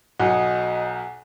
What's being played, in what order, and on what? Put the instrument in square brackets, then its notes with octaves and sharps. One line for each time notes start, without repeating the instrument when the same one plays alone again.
[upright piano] B1 F#3 [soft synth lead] D#5 [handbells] F#5 G#5